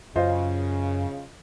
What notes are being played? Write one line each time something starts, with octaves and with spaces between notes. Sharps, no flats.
F#2 C#3 F4 C5 D#5